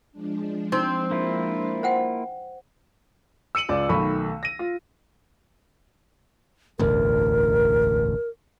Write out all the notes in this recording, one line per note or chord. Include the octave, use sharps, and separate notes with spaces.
F3 G#3 D4
C4 D#4
A#3 E4 F4
C5 F#5 G5
E6 C#7 D#7 F#7
C#2 D5
B1 D#3 A3 B5 C#6
A#6 D#7
F4
E1 A1 D2 A#4